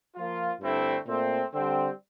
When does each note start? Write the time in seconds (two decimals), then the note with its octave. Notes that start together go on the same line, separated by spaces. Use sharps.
0.15 F3 A#3 F4
0.60 G2 D3 A3 C4 E4
1.06 A#2 A3 C4
1.53 D3 G3 C4